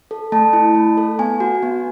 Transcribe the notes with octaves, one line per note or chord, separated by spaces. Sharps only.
A4
A3 A5
E4
A3
A4
B3 G#5
F#4
B3